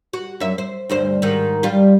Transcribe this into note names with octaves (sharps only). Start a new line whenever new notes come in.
F#4
F#2 E5
C5
D2 G2 C5
G#2 D#3
G3 F4